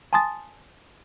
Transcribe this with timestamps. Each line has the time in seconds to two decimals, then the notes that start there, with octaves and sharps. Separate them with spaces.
0.13 G#5 A5 C6 D#6 A6